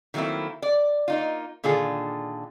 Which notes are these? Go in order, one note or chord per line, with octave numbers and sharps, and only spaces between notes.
D#3 F#3 A3 A#3 C4 E4
D5
A#3 D#4 F4
A#2 D3 D#3 F4 G#4